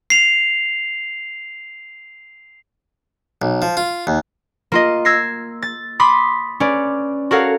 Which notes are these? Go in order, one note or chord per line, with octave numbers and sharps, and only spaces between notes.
C7 F7
B1
F3
F4
D#2
A#3 F4 D#5
E6 G#6 A#6 C7
A6
B5 C6 D6 D#6 B6
C#4 B4 D5
F#4 A4 A#4 C#5 F5 F#5